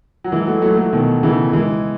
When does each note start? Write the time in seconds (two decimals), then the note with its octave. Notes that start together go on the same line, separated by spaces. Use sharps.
0.24 F#3
0.32 E3 G#3
0.47 F#3 A3
0.62 F#3 A3
0.78 F#3 A3
0.93 B2 D#3
1.23 C#3 E3
1.53 E3 G#3